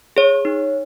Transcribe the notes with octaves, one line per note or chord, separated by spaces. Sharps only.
G#4 C#5
D#4